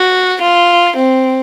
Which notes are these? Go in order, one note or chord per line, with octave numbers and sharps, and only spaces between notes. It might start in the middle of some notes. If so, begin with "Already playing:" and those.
Already playing: F#4
F4
C4